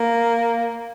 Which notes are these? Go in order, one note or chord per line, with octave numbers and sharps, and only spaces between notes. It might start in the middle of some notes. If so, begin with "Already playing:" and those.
Already playing: A#3